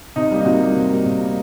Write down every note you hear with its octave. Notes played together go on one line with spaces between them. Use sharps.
C3 D#4
G3 A#3
D#4
C3 F#4
G3 A#3
C3
G3 A#3
C3
G3 A#3